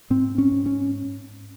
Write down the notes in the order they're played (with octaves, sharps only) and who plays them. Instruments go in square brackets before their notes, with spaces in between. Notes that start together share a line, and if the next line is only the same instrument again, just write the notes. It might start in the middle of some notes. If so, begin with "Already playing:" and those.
[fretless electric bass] G#2 C4
C#4
G#2
C#4